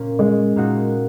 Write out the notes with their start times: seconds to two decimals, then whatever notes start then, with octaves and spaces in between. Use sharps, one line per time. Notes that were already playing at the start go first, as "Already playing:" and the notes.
Already playing: A#2 A#3 C#4
0.19 G#3
0.56 A#2 A#3 D#4 F#4